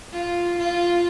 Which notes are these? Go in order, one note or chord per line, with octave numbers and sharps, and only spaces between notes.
F4
F4